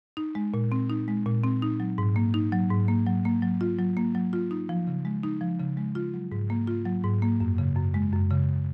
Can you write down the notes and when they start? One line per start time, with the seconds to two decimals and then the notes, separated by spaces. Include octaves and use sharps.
0.17 D#4
0.35 G#3
0.54 A#2
0.72 C4
0.90 D#4
1.08 G#3
1.26 A#2
1.44 C4
1.62 D#4
1.80 F#3
1.98 G#2
2.16 A#3
2.34 D#4
2.52 F#3
2.70 G#2
2.88 A#3
3.06 F#3
3.25 A#3
3.42 F#3
3.61 F4
3.79 F#3
3.97 A#3
4.15 F#3
4.33 F4
4.51 D#4
4.69 F3
4.87 C#3
5.05 G#3
5.23 D#4
5.41 F3
5.60 C#3
5.77 G#3
5.95 F4
6.14 F#3
6.32 G#2
6.50 A#3
6.67 F4
6.86 F#3
7.04 G#2
7.22 A#3
7.40 F#2
7.58 C#3
7.76 F#2
7.94 G#3
8.13 F#2
8.31 C#3